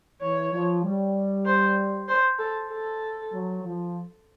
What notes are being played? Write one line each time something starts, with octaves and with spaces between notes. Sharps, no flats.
E3 C#5
F3
G3
C5
C5
A4
A4
F#3
F3